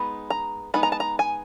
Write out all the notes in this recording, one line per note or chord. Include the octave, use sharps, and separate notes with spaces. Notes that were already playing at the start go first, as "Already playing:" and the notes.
Already playing: G#3 B3 D#4 B5
A#5
G#3 B3 D#4 B5
A#5
A5
A#5
G#5